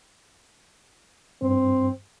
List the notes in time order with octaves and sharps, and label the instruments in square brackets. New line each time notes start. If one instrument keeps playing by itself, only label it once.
[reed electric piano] G2 [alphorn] C4